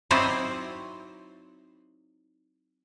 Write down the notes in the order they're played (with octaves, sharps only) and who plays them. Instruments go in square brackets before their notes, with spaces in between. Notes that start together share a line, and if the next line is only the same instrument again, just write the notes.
[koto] F#3 C4 D#4 E4 C5 D5